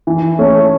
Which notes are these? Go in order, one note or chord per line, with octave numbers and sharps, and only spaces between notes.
E3
A3 C#4